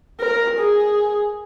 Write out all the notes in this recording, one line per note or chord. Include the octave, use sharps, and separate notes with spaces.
A#4
G#4